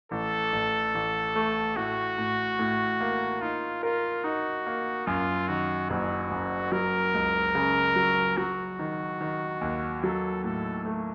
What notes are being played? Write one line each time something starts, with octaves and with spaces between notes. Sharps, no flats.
A1 A4
A1
A1
A3
A2 F#4
A2
A2
A#3
D#4 F4
F4 A#4
D#4 F#4
A#3
F#2 F4
D#3 F#4
F#1 F#4
F#2
F#3 A#4
C#2
C#3
F#3
F#3 F#4
D#3
D#3
D#2
F#3 A4
A2 A4
A3